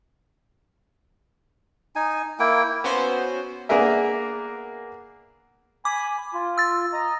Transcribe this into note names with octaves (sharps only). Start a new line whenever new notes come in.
D#4 G#5
A#3 E4 G5
B3 C#4 F#4 C5
A#3 B3 D4 G#4 A#4 E5
G#5 B5 D6
F4
E6 A6
D#5 A#5